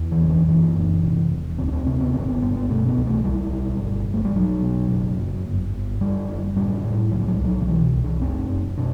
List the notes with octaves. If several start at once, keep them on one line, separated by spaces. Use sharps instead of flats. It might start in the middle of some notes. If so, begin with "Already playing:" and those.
Already playing: E2
E3
F#1
E3
F#2 E3
F#1
C3
E1
D2 C4
D4
C4
C3 C4
B3
G1 C4
B3
G1 B3
B3
B2 A3
B3
C2
A3
B1 G3
B2
G1
G1
A3
G3
B1 F#3
B2
F#1
F#2
G1
G1
F#1 G3
F#1
A2 G3
A2
C2 F#3
G3
F#3
G3
C2
F#3
D3
B2 E3
C2
D4
F#1 C4
F#1
B2 D4